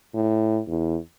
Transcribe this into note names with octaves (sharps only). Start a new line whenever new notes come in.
A2
E2